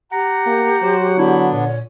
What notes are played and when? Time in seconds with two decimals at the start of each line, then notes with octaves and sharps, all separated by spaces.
0.12 G4 F#5 A#5
0.46 A#3
0.82 F#3 C5
1.17 D3 B3 D4 E4
1.53 A#2 C#5